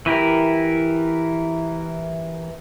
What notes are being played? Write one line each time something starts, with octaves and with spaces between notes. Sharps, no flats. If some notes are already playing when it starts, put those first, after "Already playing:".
E3 E4 G4 A#4